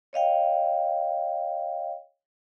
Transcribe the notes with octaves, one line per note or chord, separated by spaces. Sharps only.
C#5 D#5 F5 G5